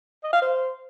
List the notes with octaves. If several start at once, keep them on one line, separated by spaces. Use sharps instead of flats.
D#5
F5
C5